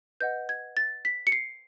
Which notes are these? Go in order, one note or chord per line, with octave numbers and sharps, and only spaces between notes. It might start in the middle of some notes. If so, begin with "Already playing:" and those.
B4 D#5 F#5 G6
G#6
A6
B6
C#7
C7